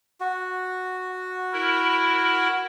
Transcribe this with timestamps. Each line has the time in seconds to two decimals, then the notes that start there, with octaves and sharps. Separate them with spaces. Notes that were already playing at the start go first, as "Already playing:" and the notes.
0.21 F#4
1.53 E4 A#4